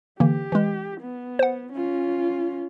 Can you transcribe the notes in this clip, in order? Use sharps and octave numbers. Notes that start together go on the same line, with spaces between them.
D3 E3 A#3 G4
E3 G#3
B3
C5 F#5
C#4 F4